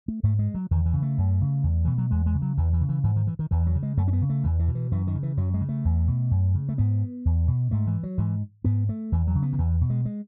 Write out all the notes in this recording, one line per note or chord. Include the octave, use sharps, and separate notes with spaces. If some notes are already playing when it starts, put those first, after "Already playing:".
A3
G#2 A3
G#3
F#3
E2 D#3
E3
C#3
A3
F#2
C#3
E2
B2 E3
F#3
E2 G#3
G#3
C#3
F#3
E2 E3
E3
C#3
E3
G#2 E3
D#3
E3
D#3
E2 E3
F#3
C#3
G#3
F#2 A3
C#4
B3
C#3
A3
E2 E3
E3
B2
E3
F#2 E3
D#3
C#3
E3
F#2 F#3
G#3
C#3
A3
E2
B2
F#2
C#3
A3
G#2 B3
E2
B2
G#2 A3
E3
F#3
G#2 E3
G#2 B3
A3
E2 E3
F#3
C#3
B3
D#3
E2 E3
B2
G#3
G#3